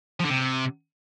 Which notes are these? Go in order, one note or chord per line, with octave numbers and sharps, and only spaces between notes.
F3
D3
C3